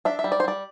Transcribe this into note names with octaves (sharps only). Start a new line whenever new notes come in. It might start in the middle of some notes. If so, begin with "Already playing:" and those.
D4 E5
E5
G3
D5
C5
G3 D5